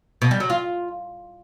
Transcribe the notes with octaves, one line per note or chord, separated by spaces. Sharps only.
B2
G3
F#3
F4